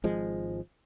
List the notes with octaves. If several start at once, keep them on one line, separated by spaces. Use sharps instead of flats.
G#1 F3 G#3